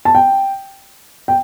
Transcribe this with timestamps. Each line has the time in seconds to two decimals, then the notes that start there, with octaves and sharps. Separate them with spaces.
0.05 A5
0.15 G5
1.28 G5